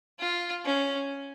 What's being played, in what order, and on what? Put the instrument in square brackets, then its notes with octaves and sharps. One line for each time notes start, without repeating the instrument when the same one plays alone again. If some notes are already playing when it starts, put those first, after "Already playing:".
[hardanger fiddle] F4
C#4